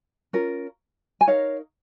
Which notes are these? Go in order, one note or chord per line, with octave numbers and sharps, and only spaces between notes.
C#4 F4 A#4
G#5
D#4 A#4 C#5 F5